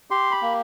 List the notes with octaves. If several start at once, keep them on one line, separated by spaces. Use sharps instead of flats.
G4 C6
B5
A#3